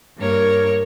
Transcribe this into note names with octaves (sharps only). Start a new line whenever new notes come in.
G2 A#3 A#4 C#5